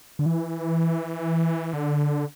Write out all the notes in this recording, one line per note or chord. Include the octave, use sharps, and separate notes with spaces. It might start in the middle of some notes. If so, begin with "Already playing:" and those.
D3
E3
D3